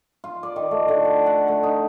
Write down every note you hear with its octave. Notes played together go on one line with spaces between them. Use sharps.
F4
D5
D#3
A3
D3
F#5
F#5
A3
D#4